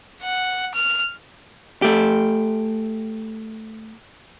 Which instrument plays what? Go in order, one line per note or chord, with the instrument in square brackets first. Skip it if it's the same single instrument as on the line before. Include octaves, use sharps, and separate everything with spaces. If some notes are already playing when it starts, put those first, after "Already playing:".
[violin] F#5
F6
[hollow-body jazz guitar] A3 G4